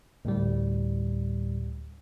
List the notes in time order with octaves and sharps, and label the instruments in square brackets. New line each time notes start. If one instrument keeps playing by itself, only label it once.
[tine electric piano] D2 A2 G3